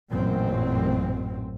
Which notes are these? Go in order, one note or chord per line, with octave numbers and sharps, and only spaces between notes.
A1 F#2 A#2 C4